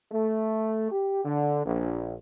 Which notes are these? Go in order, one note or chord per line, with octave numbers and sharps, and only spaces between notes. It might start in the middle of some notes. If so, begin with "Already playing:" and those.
A3
G4
D3
A#1